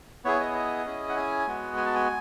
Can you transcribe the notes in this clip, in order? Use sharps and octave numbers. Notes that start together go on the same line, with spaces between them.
B3 E4 G#4 C#5
D#5
D#5
C#4 E4 G#4
F#5
G#5
G#3 B3 F#4
G#5
A5
G#5